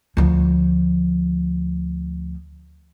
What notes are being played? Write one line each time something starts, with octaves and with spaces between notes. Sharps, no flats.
D2 F3